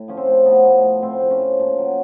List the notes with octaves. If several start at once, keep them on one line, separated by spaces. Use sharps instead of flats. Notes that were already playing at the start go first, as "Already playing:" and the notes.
Already playing: A2
F3 C#4
C4
A2
F3 B3
A2
F3
A2 C4
F3
C#4
F3
A#2
F#3